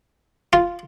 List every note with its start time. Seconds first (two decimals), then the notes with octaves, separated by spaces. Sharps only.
0.53 F4